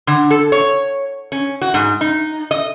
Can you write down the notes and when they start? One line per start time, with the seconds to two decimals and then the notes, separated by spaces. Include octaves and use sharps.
0.07 D3
0.31 A4
0.52 C#5
1.32 C#4
1.62 F#4
1.74 G#2
2.01 D#4
2.51 D#5